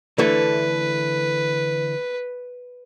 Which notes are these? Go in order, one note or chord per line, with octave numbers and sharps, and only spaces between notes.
D3 E3 A3 B4